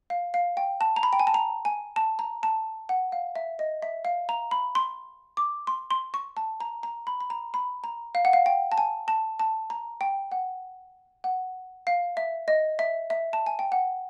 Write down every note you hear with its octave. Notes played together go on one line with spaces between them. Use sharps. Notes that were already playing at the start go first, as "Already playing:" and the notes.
F5
F5
G5
A5
A#5
B5
G5
G#5
A5
A#5
G#5
A5
A#5
A5
F#5
F5
E5
D#5
E5
F5
A#5
B5
C6
D6
C6
C6
C#6
A5
A#5
A#5
B5
B5
A#5
B5
A#5
F5
F#5
F5
G5
A5
G#5
A5
A5
A#5
G5
F#5
F#5
F5
E5
D#5
E5
E5
A5
G#5
G5
F#5